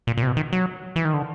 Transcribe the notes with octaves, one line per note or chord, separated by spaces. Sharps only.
A#2
A#2
C3
B2
D#3
F#3
E3
D#3
D3